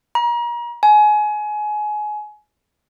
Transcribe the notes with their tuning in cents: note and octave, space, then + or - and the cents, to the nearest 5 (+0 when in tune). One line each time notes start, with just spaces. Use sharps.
A#5 +35
G#5 +25